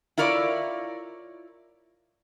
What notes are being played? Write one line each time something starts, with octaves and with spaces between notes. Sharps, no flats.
E4 F4 A#4 C#5 D5